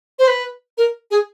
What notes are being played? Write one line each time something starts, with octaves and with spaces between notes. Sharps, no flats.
C5
B4
A#4
G#4